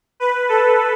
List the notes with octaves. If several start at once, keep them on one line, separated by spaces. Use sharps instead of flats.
B4
A4